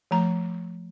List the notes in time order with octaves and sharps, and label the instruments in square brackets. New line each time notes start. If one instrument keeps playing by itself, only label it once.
[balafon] F3 A3 A#5